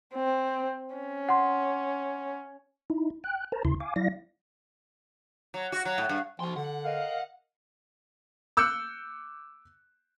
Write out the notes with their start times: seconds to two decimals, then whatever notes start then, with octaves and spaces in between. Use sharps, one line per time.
0.15 C4
0.95 C#4
1.29 F#5 C6
2.90 D#4 E4
3.24 G5 F#6
3.52 A#4 C5 A5 A#5
3.65 D#2 C#3 E4 C6
3.80 F5 G#5 D6
3.96 F#3 E4 D5 F5 A#6
5.54 F#3
5.72 F#4
5.85 F#3
5.98 A2
6.09 G2
6.40 F3 F#4 C6
6.57 D3 F#5
6.85 A#4 D#5 F5
8.57 D6 E6 F#6 G6 C#7